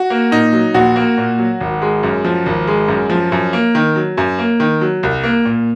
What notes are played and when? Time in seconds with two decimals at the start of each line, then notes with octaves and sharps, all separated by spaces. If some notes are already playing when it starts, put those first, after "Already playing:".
Already playing: F#4
0.10 A#3
0.31 A#2 D#4
0.53 F#3
0.74 A#1 F#4
0.96 A#3
1.18 A#2
1.38 F#3
1.61 G#1
1.82 G#3
2.03 F#2
2.25 F3
2.46 G#1
2.68 G#3
2.88 F#2
3.10 F3
3.32 F#2
3.53 A#3
3.75 D#3
3.96 F#3
4.17 F#2
4.38 A#3
4.60 D#3
4.81 F#3
5.03 C2
5.24 A#3
5.45 A#2